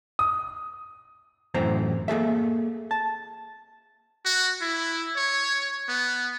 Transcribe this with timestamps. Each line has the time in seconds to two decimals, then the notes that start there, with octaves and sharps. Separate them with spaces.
0.19 D#6
1.54 F#2 A2 E3 C4 C5 A#5
2.08 A#3 G#4 A4 E5
2.91 A5
4.25 F#4
4.62 E4
5.16 C#5
5.88 B3